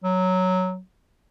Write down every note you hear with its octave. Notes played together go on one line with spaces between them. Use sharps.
F#3